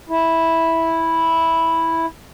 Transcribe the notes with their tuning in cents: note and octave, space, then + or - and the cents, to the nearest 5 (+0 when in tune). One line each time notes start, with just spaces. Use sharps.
E4 -5